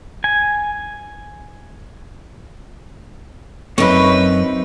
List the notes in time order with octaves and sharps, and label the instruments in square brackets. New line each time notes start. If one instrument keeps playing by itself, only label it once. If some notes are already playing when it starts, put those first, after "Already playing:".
[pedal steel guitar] G#5
[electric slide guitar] F#2 B2 C#5 [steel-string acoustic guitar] C4 D#4 [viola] B4